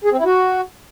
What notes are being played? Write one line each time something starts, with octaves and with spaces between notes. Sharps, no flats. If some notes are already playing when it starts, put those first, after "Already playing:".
G#4
C4
E4
F#4